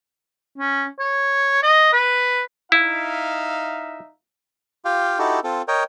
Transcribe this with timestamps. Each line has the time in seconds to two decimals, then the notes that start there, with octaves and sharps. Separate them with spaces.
0.58 C#4
0.99 C#5
1.63 D#5
1.93 B4
2.72 D#4 E4 E5 F5
4.85 F4 G4 F5 G5
5.19 D#4 E4 F#4 G4 A4
5.44 C4 F4 A4
5.68 A#4 C#5 D#5 G5